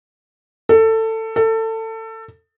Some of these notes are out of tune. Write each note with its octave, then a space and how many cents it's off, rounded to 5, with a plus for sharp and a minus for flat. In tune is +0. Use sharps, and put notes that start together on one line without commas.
A4 +20
A4 +25